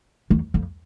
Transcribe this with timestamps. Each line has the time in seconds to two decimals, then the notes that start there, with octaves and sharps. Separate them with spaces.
0.30 E2
0.54 F2